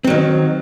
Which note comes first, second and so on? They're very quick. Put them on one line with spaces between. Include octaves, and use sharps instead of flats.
C4 F#3 D#3